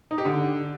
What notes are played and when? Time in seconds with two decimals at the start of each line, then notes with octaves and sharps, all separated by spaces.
0.11 D#4
0.18 G4
0.25 D3